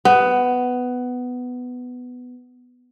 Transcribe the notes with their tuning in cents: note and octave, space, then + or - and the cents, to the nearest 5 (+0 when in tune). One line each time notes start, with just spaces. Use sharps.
B3 +10